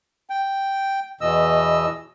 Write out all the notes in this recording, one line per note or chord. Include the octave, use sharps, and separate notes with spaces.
G5
E2 B2 E3 D#5 E6